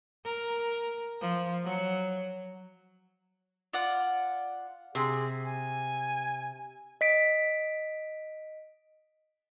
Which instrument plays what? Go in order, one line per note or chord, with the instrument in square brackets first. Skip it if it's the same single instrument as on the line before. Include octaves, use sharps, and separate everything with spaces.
[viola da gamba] A#4
F3
F#3
[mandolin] F4 D5 F#5
[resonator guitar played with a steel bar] C3 [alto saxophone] G#4
[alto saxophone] G#5
[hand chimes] D#5 B6 D7